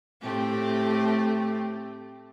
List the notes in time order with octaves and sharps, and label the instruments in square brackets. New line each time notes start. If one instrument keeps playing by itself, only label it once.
[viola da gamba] A2 G4 [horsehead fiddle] A3 C4